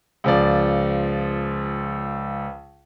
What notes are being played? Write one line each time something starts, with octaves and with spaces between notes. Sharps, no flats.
C#2 F3 D5